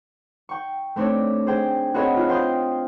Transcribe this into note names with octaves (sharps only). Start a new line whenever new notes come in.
G5 C#6
A3 C4 D4 C#5 D5
G#4 C5 G5
C4 F#4 G#4 B4 C#5 D#5
F4 F#4
C5 G5 C6 D#6 G6